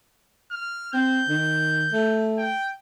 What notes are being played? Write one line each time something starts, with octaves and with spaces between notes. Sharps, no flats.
F6
C4 G6
D#3
A3
G5